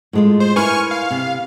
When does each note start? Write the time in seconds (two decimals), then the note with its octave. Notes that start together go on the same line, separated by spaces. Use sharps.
0.13 A2 G#3 F4
0.40 C5
0.56 E4 A#4 B4 G#5 C#6 F6
0.91 F5
1.11 C3